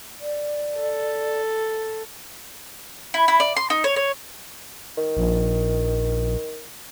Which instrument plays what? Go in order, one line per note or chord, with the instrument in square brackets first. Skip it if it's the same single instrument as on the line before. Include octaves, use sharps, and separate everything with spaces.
[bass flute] D5
[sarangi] A4
[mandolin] E4
E4
D5
C6
D#4
C#5
C#5
[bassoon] D#3
[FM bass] A#1